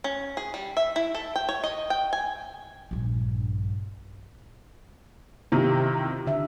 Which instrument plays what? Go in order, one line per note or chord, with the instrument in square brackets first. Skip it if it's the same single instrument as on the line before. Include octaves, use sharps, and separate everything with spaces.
[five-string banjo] C#4
G#4
G3
E5
E4
A4
G5
C#5
D#5
G5
G#5
[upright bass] A#1 G2
[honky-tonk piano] C3 D#3 [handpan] E4 F4 G4
[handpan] D3 E5